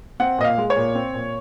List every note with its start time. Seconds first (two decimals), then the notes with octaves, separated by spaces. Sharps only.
0.20 C4 F#5
0.38 A#2 D#5
0.44 F5
0.58 G#3
0.70 C#5
0.76 A#2
0.95 C4
1.14 A#2